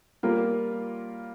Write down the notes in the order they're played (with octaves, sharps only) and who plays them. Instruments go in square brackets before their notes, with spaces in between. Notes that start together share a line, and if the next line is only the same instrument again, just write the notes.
[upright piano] G3 A#3 F4 A#4